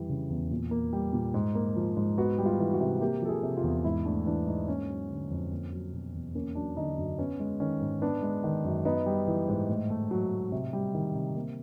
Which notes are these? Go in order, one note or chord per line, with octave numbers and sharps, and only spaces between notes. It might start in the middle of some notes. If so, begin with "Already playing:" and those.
Already playing: F2 E3 G3
C#3
E2
A#2
A#3
G3
A#2
G#2
A#3
F3
G#2
B3 F#4
G3
F4
E3
F#4
C3
A#3 G4
F3 A4
G#4
C3
F4
E2
G#2 E4
A3 D4
E3 D4
G#2 D#4
A#3 C#4
F#3
D3
F2
A#3
F#3
B2
E2
A#3 C#4
F#3 D4
D3 D#4
F#2 D4
B3 C#4
G#3
D#3 C#4
G#2
B3 D4
G#3
D#3
F#2
B3 D#4
G3
E3
G#2
A2
A3
F#3
A2
C3
G3
D#3
C3
A#3